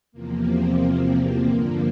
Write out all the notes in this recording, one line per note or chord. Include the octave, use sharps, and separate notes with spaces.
E2 C3 F3 A#3
C4
A#3
G2 D3 F3 A#3